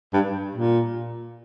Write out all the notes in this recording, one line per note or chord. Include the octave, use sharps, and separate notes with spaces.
G2
A#2